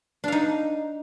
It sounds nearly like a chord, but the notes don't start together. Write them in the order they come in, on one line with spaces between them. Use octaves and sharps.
D4 F5 D#4